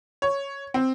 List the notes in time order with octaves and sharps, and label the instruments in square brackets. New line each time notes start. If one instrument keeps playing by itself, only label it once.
[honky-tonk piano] C#5
C4